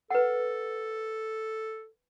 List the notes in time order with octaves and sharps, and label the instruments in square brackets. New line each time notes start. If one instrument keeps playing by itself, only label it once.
[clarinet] A4 [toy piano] B4 F#5